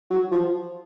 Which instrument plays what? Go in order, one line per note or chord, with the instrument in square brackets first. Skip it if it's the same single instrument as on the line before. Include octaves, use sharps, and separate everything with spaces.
[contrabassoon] F#3
F3